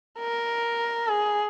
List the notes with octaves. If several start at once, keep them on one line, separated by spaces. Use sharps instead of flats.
A#4
G#4